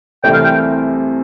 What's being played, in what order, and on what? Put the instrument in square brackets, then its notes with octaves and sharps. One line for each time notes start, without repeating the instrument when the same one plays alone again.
[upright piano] C2 C3 E3 A3 C4 [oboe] G5
[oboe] F5
G5